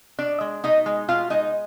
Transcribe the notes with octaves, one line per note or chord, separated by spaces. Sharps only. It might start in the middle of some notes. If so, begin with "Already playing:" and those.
B2 D4 D5
G#3
B2 D#4 D#5
G#3
B2 F4 F5
G#3 D#4 D#5